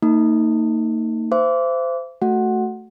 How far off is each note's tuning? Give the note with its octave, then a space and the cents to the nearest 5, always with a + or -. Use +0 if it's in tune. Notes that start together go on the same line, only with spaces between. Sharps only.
A#3 -40 D#4 +10
C5 -20 E5 +40 D6 -25
A3 +0 F#4 +0 F#5 +0